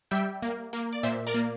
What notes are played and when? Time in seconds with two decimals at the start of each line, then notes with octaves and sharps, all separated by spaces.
0.11 G3 E5 G5
0.42 A#3
0.73 A#3
0.93 D5
1.03 A#2 C5 E5
1.27 A#4 D5
1.34 A#3